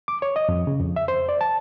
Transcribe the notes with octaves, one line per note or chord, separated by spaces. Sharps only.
D6
C#5
D#5
F2
C#3
F2
E5
C5
D5
A5